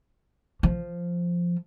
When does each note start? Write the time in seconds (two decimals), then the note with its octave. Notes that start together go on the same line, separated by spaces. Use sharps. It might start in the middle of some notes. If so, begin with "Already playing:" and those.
0.63 F3